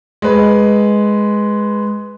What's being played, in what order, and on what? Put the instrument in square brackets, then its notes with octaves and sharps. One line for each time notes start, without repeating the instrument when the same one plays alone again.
[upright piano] G#3 B4